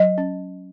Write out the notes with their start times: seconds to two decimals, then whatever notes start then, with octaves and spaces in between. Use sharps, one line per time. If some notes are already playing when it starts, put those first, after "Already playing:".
Already playing: F#3 D#5
0.18 C#4